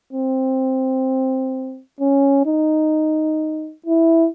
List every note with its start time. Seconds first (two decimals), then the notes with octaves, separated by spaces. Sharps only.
0.13 C4
2.01 C#4
2.46 D#4
3.86 E4